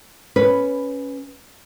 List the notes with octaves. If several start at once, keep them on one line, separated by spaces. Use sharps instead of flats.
C#4 B4